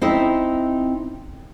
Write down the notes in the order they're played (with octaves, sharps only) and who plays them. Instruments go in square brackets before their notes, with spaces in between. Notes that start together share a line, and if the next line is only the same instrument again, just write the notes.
[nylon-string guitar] C4 D#4 E4 D#5 E5